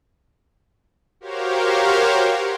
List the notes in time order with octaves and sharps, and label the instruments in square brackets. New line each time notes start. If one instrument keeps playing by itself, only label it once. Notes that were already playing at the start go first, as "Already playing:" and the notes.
[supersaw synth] F#4 G4 A#4 C5 C#5 F5